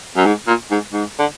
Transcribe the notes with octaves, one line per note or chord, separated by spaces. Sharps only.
F#2
G#2
A#2
G#2
G#2
D3